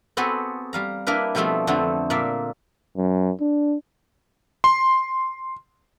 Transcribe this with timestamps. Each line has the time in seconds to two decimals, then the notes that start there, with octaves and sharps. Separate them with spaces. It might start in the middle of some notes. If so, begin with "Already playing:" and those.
0.17 B3 C4 F#4 G#4 A4 B4
0.73 G3 F5 A#5
1.07 A#3 D4 E4 A#4 B4
1.35 B2 F3 G3 A3 B3 C4
1.67 F2 D3 A3 B3 C4
2.10 A#2 A#3 D5 E5
2.97 F#2
3.41 D4
4.64 C6